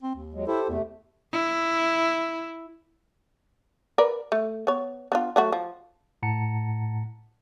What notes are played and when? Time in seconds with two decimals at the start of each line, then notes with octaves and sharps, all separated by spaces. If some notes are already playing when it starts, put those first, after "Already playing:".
0.03 C4
0.15 D#2
0.34 F#3 G#3
0.47 E4 G4 A4 C5
0.69 E2 C3 A3
1.32 E4
3.98 A#4 B4 D5
4.32 A3
4.67 B3 C#5
5.12 B3 D4 F4
5.36 F#3 A3 F#4
5.52 F3
6.23 A2 F#5 A5 A#5 C#7